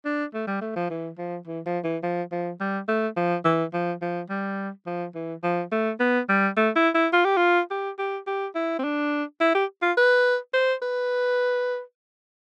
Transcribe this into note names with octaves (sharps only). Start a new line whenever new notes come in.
D4
A3
G3
A3
F3
E3
F3
E3
F3
E3
F3
F3
G3
A3
F3
E3
F3
F3
G3
F3
E3
F3
A3
B3
G3
A3
E4
E4
F4
G4
F4
G4
G4
G4
E4
C4
D4
E4
G4
F4
B4
C5
B4